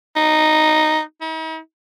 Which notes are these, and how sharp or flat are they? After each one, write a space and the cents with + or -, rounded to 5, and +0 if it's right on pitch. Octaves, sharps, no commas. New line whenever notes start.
D#4 -5
D#4 +45